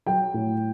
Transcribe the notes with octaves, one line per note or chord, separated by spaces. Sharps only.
F#3 G5
A2